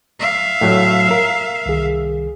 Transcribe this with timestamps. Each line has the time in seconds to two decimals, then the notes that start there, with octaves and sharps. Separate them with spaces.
0.20 E5 F5
0.61 A2 F#3
1.11 A#4
1.66 C2 D#3 G#4